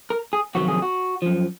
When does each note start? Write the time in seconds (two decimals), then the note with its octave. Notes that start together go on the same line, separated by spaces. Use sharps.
0.10 A#4
0.33 G#4
0.55 F2 C3 D#3 F#3 F#4
0.68 G#4
0.82 F#4
1.22 F#2 F3